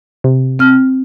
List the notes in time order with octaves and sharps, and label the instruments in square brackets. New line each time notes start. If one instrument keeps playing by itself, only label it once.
[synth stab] C3
[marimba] C4 F6